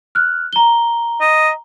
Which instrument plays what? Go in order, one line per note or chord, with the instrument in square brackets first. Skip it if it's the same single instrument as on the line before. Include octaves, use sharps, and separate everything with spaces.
[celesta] F6 F#6
A#5 G7
[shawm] D#5